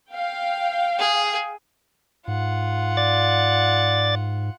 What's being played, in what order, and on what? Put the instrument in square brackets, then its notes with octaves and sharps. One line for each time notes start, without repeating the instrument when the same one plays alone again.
[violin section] F5 G5
[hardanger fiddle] G#4
[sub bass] G#2 [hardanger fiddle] F4 F#5
[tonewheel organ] D5 A6